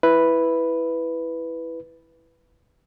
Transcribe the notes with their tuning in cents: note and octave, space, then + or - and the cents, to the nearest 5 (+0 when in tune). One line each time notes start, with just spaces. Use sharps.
E4 +0 B4 +0